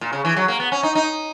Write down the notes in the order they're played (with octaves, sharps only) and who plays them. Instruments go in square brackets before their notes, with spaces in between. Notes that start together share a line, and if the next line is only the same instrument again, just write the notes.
[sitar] A#2
C#3
E3
F#3
A#3
B3
C#4
D#4
D#4